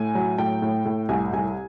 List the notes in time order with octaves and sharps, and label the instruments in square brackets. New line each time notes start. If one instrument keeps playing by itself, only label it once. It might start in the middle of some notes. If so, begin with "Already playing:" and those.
Already playing: [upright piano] A2 G#5
F#3
A2 G5
A2
A2
C2 G#5
C2 G#5